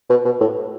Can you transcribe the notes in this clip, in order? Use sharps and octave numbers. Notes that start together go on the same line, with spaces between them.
B2
B2
A2